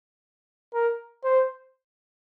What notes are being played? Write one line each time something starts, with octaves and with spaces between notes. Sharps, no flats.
A#4
C5